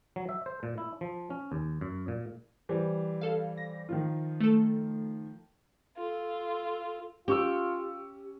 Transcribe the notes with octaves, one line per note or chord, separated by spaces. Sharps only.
F#3
E5
C5
A#2
E4
F3
C#4
D#2
F#2
A#2
E3 G3 C5
A4 F5
A#6
D#3 F3 F4
A3 A4
F4 A4
C#4 F4 G4 C#6 E6